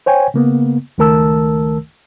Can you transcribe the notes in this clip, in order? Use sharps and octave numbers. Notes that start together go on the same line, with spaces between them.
C5 C#5 G5 G#5
C#3 A#3 B3
C#2 D#3 A3 A#4 A5 E6